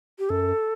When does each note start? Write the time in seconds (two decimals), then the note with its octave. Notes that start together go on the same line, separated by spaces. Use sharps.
0.19 G4
0.29 F#2 A4